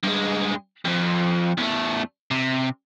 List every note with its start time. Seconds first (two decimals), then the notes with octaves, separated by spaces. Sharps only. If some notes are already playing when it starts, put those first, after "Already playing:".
0.03 G2 G#3
0.85 F2 F3
1.57 E2 A3
2.31 C3